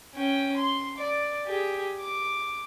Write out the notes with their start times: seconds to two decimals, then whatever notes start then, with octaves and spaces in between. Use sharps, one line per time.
0.15 C#4 G5
0.57 C6
0.97 D5
1.46 G4 G#4
2.00 D6